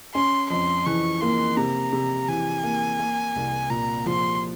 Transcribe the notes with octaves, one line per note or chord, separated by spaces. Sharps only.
C#4 C6
F2 C6
E3 C#6
A#3 C6
C3 A#5
C3
E3 G#5
A#3
A#3
C2
A#2 A#5
F3 C6